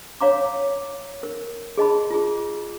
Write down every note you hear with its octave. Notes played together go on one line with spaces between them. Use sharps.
C#5 F5 A#5 D6
A#4
G#4 D#5 A5 B5
F4 G#4